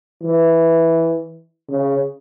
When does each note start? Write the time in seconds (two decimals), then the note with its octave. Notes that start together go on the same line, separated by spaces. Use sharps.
0.23 E3
1.70 C#3